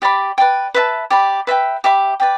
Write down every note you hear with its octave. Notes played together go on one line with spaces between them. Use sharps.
G4 D5 B5 D6
B4 D5 G5
B4 E5 A5
G4 D5 B5
B4 E5 G5
G4 E5 B5 D6
B4 D5 G5